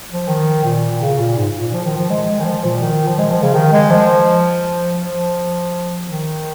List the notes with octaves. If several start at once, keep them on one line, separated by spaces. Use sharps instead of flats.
F3
D#3
A#2
C#3
A#2
G#2
A#2
F3
D#3
F3
G#3
D#3
F3
A#2
D#3
F3
G#3
F3
C#3
D#3
G#3
F3
F3
D#3